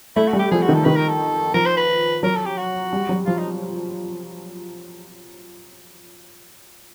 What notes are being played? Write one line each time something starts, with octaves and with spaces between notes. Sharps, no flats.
A3 E4
F#4
G3
G4
F3 G#4
F#4
D#3
A4
D#3 B4
A#4
A4
F3 A#4
C5
B4
F#3 A#4
A4
G4
F#4
G3
F#3
F3 F4
D#4